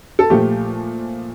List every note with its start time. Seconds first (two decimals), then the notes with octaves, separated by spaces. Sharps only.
0.19 A4
0.30 A#2 F3 A3 G4